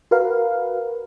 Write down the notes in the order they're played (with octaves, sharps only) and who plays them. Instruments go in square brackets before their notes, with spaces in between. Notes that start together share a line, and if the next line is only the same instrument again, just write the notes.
[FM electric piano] F#4 A#4 B4 F5